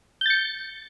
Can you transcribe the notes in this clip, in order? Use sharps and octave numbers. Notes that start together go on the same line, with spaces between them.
G6 A6 C#7